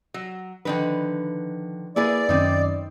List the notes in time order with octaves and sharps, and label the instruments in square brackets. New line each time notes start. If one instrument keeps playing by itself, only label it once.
[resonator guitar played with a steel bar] F#3
[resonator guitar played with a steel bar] D3 D#3 B4 [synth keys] F3 D4
[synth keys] A#3 [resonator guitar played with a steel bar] E4 G#4 B4 [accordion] D5
[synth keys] F#2 D#3 C#4 [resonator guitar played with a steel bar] C4 D#4